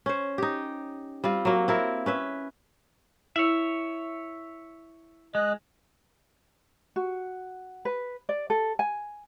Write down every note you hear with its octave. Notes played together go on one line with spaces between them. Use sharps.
C#4 C5
D#4 G4
G3 C4 F4
F#3 A#3
C4 E4 A#4
C#4 B4 E5
E4 C#5 E5
G#3 D#5 F#6
F#4
B4
D5
A4
G#5